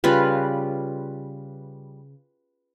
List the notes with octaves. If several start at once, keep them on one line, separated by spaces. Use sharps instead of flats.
C#3 G3 F4 B4